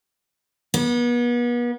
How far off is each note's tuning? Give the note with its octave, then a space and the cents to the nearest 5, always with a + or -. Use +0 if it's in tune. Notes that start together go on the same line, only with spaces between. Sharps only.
B3 -40